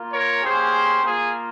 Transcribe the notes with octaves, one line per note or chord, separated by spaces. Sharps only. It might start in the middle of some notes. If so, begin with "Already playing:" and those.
Already playing: A#3 F4
A#4 C#5
A#3 C#4 G4 G#4 C5
A#3 F4 G#4